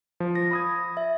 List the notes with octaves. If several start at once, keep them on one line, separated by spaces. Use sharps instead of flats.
F3
A#6
B5 D#6 G#6
E5